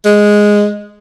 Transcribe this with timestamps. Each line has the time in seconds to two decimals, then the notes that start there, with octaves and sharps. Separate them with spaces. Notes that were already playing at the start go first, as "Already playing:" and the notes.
0.05 G#3